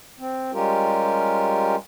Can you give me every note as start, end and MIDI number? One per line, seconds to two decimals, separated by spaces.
0.19 0.51 60
0.53 1.76 55
0.53 1.76 56
0.53 1.76 61
0.53 1.76 65
0.53 1.76 67
0.53 1.76 70